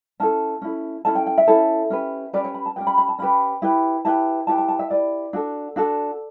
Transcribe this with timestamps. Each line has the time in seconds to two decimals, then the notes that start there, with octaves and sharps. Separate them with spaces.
0.20 C#4 E4 A4 A5
0.62 C#4 E4 A4
1.05 C#4 E4 A4 A5
1.15 G5
1.26 G5
1.38 E5
1.48 C#4 E4 A4
1.90 C#4 G4 B4
2.33 C#4 G4 B4 D5
2.44 C#5
2.54 B5
2.66 A5
2.76 C#4 G4 B4 G5
2.87 B5
2.98 B5
3.08 A5
3.18 C#4 G4 B4 B5
3.62 E4 G4 B4
4.05 E4 G4 B4 A5
4.47 E4 G4 B4 A5
4.58 A5
4.69 A5
4.79 E5
4.90 E4 G4 B4 D5
5.33 D4 F#4 A4
5.76 D4 F#4 A4